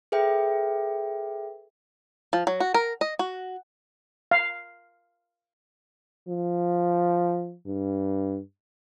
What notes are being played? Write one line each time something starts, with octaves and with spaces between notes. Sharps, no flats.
G#4 A4 B4 E5 G5
F3
F#3
F#4
A#4
D#5
F#4
F5
F3
G2